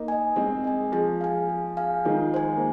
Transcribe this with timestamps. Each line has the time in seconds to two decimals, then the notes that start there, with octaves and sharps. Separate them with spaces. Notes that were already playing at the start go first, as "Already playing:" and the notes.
Already playing: A#3 D#4
0.08 D#5 G#5
0.36 G#3 C4 G#4
0.64 D#5 G#5
0.92 F3 G#4
1.21 F5 G#5
1.49 G#4
1.77 F5 G#5
2.05 D#3 G#3 F4
2.34 C5 G#5
2.57 A#3